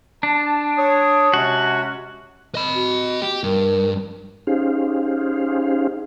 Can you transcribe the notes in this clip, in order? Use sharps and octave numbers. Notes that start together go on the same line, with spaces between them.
D4 A5
C#5 D#6
C3 G#3 C#4 F#4
D#5 B5
F#4
G4
G2 A#4
C#4 D#4 G4 G#4 C5 F5